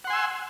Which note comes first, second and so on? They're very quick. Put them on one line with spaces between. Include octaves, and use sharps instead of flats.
F#5 C6 G#5 E6